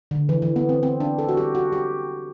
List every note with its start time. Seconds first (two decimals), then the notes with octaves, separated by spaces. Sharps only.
0.11 D3
0.29 E3
0.42 E3
0.56 B3
0.69 C4
0.83 C4
1.00 D4
1.19 A4
1.29 F#4
1.37 G4
1.55 F#4
1.73 G4